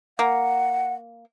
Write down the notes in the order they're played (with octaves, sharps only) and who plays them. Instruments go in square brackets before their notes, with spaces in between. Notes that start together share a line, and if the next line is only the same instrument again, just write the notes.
[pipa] A#3 [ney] F#5